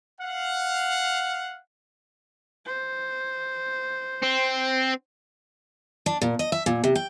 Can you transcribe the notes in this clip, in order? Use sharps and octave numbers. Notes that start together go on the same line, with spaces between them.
F5 F#5
C5
C4
D4
A#2
D#5
E5
A#2
C3
G5